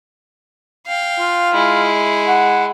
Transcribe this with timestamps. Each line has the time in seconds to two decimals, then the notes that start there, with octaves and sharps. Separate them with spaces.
0.86 F5 G5
1.19 F4
1.54 G#3 E4
2.27 F#5